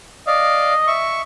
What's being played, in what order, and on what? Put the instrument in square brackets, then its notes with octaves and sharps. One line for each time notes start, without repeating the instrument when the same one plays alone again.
[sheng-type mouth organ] D5 F5 [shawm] D#5
[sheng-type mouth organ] E5 C#6